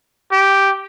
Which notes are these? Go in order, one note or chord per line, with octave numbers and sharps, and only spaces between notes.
G4